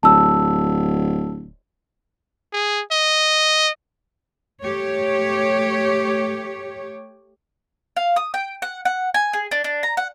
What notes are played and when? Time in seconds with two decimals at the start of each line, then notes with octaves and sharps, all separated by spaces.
0.03 D1 A5 E6
2.53 G#4
2.92 D#5
4.63 A3 G4 C#5
7.96 F5
8.16 D#6
8.34 G5
8.62 F#5
8.85 F#5
9.14 G#5
9.33 G#4
9.51 D4
9.64 D4
9.83 A#5
9.97 F#5